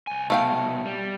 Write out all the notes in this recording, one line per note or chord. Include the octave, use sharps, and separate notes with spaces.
C2 G#5
C2 B2 A3 F5 G5
G3